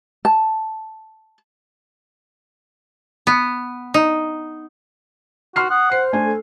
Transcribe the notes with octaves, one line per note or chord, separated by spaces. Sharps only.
A5
B3
D#4
F#4 C6 F6 C7
F#5 D#6
C5 C7
A3 D4 C5 G#5
A4